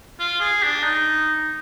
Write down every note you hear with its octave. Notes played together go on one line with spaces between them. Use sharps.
F4
G#4
D4
D#4